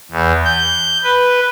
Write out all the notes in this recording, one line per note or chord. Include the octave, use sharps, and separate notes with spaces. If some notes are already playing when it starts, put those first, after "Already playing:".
E2
G6
B4